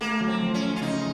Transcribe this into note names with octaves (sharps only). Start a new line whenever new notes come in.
A3 A#3
F#3
C4
F3
C#4
F4
C#3 D#4